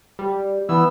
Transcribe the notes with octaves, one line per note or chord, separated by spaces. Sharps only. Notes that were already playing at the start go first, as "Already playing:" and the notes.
G3
E3 B3 E6